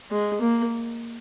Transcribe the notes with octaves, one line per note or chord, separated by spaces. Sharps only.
G#3
A#3